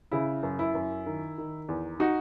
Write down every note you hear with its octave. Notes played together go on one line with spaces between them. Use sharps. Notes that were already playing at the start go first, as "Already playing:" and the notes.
C#3 E4
F#2
E4
F#2
D#3
D#3
E2
D#4 F#4